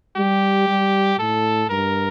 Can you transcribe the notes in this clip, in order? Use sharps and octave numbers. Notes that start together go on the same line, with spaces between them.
G3 G4
G3
A2 A4
G2 A#4